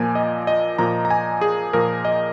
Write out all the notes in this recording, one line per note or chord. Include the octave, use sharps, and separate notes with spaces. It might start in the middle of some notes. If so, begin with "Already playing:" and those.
Already playing: A#2 F3 A#3 G#5
D#5
D#5
A#2 F3 A#3 A#5
A#5
G#5
G#4
A#2 F3 A#3 A#4
D#5